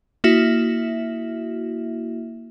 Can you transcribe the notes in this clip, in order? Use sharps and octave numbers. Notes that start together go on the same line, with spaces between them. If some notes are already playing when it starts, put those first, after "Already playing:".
A#3 E4 F#4 E5